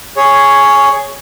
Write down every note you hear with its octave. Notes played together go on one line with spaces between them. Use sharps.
G#4 C#5